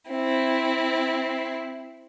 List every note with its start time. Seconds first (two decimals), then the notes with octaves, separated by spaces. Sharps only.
0.10 C4 E4